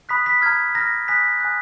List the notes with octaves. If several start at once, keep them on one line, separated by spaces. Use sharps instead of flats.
B5 D#6 F#6 B6
B6
A#5 F6 G#6
A#5 F6 A#6
G#5 D#6 F#6 B6
G#5 D#6 F#6